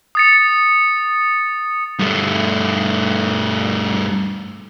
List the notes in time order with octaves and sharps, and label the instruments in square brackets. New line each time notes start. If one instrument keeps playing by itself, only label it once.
[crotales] D#6 A6 C#7
[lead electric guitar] G2 A3